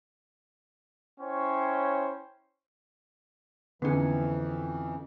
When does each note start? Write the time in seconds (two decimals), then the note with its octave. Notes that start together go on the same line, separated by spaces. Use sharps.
1.20 C#4 E4 C5 C#5 G5
3.82 F2 D3 E3 B3 C#4 D#4 G#4